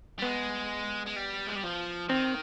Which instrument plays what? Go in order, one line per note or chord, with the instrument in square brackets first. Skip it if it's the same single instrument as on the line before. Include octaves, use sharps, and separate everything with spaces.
[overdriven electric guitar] G3
[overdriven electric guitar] G#3 [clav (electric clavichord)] B3
[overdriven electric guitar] G#3
G3
G#3
G3
F3
[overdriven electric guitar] D#3 [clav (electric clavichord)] C4